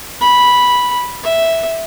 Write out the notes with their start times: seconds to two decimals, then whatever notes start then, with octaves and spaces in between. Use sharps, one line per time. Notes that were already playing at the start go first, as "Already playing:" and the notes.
0.21 B5
1.23 E5